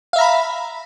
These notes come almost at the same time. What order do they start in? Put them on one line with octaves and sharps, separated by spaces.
F5 E5 A#5 B5